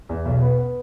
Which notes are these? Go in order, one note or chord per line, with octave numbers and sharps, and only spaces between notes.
E2
B1
B3
B3